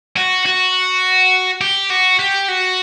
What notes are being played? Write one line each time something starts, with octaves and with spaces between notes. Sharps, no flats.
F#4
F#4
G4
F#4
G4
F#4